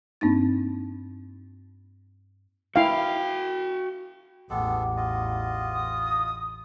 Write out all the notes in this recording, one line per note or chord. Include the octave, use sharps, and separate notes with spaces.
G2 A#3 C4 D4 D#4 A6
E4 F#4 F5 G5
A1 E2 G#3 B3 A4 F#5 G5 D6
F4 D#5
D#6